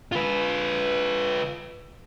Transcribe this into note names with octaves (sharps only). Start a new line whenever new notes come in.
F4 B4